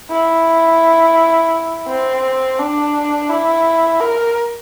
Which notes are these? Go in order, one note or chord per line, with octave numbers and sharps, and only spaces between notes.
E4
C4
D4
E4
A#4